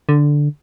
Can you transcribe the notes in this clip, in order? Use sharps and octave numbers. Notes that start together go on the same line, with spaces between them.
D3